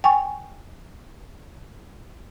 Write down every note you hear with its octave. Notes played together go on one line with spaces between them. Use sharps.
G5 G#5 C#6